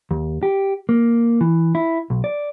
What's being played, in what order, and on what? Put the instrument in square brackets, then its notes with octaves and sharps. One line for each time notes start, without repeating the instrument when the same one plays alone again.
[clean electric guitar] D#2
G4
A#3
E3
E4
B1
D5